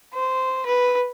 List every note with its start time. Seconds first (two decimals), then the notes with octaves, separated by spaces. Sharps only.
0.14 C5
0.66 B4